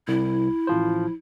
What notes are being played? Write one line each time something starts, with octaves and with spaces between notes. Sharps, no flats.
C2 E4
A1 F3 C5